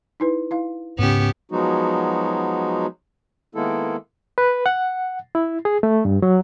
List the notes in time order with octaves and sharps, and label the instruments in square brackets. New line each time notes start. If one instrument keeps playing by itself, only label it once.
[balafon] D#4 E4 B4
E4 F5
[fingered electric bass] G#2 C#3 [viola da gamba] B3 C#4 G4
[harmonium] F3 F#3 G#3 B3 D#4 F#4
D#3 G#3 A#3 B3 E4 A4
[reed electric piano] B4
F#5
E4
G#4
A3
G2
F#3